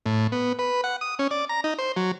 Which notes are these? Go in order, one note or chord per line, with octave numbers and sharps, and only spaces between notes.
A2
B3
B4
F#5
D#6
C#4
D5
A#5
D#4
C5
F#3